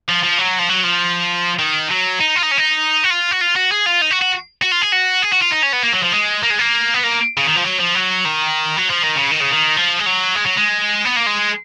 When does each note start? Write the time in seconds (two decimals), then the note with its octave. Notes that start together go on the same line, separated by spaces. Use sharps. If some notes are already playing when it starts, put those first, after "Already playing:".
0.08 F3
0.23 F3
0.38 F#3
0.58 F3
0.69 F#3
0.84 F3
1.59 D#3
1.90 F#3
2.20 D#4
2.36 F4
2.42 D#4
2.51 C#4
2.58 D#4
3.03 F#4
3.10 F4
3.31 F#4
3.41 F4
3.56 F#4
3.72 G#4
3.86 F4
4.02 D#4
4.11 F#4
4.22 F#4
4.62 F#4
4.72 F4
4.82 G#4
4.93 F#4
5.23 G#4
5.33 F#4
5.42 F4
5.52 D#4
5.63 C#4
5.73 B3
5.83 A#3
5.92 F#3
6.02 F3
6.12 G#3
6.43 A#3
6.50 G#3
6.59 A#3
6.94 B3
7.04 A#3
7.37 C#3
7.46 D#3
7.56 F3
7.64 F#3
7.79 F3
7.95 F#3
8.25 D#3
8.77 F#3
8.90 F3
9.03 D#3
9.15 C#3
9.31 D#3
9.40 C#3
9.51 D#3
9.76 F3
9.99 G#3
10.06 F#3
10.36 G#3
10.46 F#3
10.57 G#3
11.05 B3
11.16 A#3
11.26 G#3